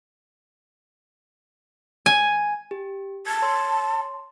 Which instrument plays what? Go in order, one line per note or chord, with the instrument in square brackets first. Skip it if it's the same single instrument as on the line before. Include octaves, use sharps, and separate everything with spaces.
[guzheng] G#5
[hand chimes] G4
[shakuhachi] A5 [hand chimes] G#6
[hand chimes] C#5 C6